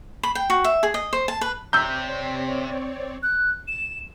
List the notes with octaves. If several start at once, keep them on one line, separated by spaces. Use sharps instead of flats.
B5
G5
F#4
E5
G#4
D#5
C5
A5
B4
C3 C4 C#5 D5 A#5 E6 G6
F#6
E7